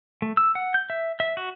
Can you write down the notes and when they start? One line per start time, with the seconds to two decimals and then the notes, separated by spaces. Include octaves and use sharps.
0.22 A3
0.37 E6
0.55 F#5
0.74 G6
0.90 E5
1.20 E5
1.37 F#4